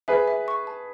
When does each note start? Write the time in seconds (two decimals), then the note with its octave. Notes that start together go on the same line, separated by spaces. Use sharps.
0.08 G#4 B4 E5
0.28 E5
0.48 C#6
0.67 A5